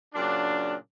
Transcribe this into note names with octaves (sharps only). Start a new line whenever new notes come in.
A#2 C#3 F#3 D4